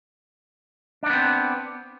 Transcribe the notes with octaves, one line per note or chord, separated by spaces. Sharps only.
B3 C4 D4 D#4